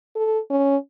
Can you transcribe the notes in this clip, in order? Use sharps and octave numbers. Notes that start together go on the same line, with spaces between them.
A4
C#4